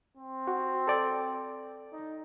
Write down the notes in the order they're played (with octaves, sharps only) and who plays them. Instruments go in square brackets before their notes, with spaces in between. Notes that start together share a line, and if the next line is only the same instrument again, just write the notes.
[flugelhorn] C4
[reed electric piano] F#4
A4 D5 G5
[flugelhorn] D#4